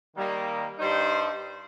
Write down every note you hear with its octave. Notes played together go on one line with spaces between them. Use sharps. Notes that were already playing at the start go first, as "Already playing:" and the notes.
D#3 G3 A#3
G2 G3 D#4 C5